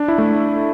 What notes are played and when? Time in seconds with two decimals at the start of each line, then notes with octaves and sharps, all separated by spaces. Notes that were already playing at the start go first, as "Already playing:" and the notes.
Already playing: D4
0.08 E4
0.18 A3